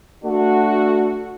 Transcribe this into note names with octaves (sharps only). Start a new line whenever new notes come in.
A3 D4 F#4